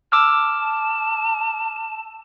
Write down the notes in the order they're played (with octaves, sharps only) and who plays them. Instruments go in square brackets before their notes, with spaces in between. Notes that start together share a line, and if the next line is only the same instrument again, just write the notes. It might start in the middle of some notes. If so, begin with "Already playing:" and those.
[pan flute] A5 [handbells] D6 E6 F6